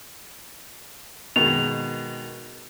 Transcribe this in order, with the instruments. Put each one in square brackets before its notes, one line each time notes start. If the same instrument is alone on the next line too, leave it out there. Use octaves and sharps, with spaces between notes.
[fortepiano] B2 D#3 G#3 [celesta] F7